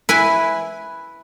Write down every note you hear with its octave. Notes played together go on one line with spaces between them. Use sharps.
E4 B4 G#5